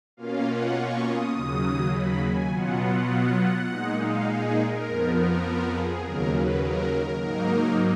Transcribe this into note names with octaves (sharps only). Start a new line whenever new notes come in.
B2 A#3 C#4 F4 F5
F#5
C#6
D#6
D#2 C#3 F#3 D#6
B5
G#5
B2 F#3 B3 F4 F#5
F#5
F#5
F#5
A#2 G#3 D#4
F5
G#4
A#4
F2 F3 B3
A#4
G#4
D#2 C#3 F#3 A#4
B4
A#4
A#4
G#2 F#3 A#3 D#4 A#4